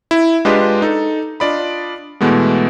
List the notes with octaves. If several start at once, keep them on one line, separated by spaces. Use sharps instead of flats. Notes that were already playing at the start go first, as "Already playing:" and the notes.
E4
G#3 D4 F4 G4 B4 D#5
D#4 A4
D4 F4 D5 D#5 B5
B2 E3 G#3 A3 B3